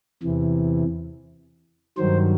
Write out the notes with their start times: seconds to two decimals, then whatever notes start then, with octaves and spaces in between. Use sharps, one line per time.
0.23 E2 C3 E3
1.97 G2 D#3 F#3 C5